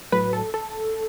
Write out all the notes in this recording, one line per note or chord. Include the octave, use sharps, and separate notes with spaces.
A2 F#3 B4
A4
A4